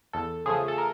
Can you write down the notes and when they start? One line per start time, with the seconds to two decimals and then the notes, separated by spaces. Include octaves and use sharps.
0.13 E2 A4
0.46 C#3 F3 A3 G#4
0.68 A4
0.78 A#4